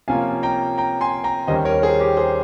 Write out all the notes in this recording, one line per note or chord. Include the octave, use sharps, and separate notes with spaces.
C3 F3 A#3 C#4 F4 F5 G#5
G5 A#5
G5 A#5
G#5 C6
G5 A#5
D#2 D#3 G3 C#4 C5 D#5
A#4 C#5
G#4 C5
G4 A#4
G#4 C5